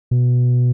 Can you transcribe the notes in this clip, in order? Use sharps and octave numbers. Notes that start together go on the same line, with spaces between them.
B2